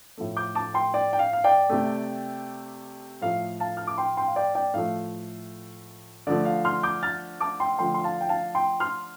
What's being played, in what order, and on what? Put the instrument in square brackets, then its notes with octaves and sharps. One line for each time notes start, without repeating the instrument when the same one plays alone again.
[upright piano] A2 F3 A3
D6 G6
A5 D6
G5 C6
D5 G5
G5
F5
F5
D5 G5
C3 A3
A2 F3 A3 F5
F5 A5
F6
D6
G5 C6
G5 C6
F5
D5 G5
D5 G5
A2 F3 A3 F5
D3 F3 A3 D5
F5
C6 F6
D6 G6
F6 A6
A5 D6
G5 C6
D3 F3 A3 G5 C6
C6
F5 A5
G5
F5 A5
G5 C6
C6 F6